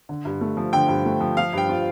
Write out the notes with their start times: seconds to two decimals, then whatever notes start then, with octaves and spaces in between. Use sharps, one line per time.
0.09 D3
0.25 G2
0.41 A3
0.57 F3
0.73 D3 G5
0.89 G2
1.05 A3
1.20 F3
1.37 F3 F5
1.53 G2 G5
1.69 F4